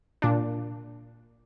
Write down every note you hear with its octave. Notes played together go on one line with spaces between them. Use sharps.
A#2 D4